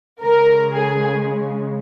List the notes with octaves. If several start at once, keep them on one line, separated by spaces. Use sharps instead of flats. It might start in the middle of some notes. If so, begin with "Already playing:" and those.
C#3 G#3 A#4
G#4